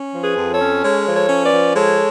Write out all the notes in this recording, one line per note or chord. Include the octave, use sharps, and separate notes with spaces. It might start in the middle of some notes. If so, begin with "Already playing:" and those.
Already playing: C#4
F3
G#4 B4
F2
A4 C#5
C#4
G#3 A4 C#5
F3
A4 C#5
C#4
B4 D5
F3
G#3 A4 C#5